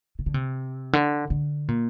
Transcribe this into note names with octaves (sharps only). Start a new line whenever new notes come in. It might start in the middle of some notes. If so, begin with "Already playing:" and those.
C3
D3
C3
D3
D3
A#2